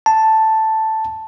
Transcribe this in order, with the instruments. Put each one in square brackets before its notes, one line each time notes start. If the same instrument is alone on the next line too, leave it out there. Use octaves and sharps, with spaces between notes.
[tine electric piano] A5